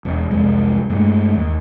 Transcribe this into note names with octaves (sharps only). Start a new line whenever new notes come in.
E1
C2 F2 G#3
G2 G#3 A3
D1 D#2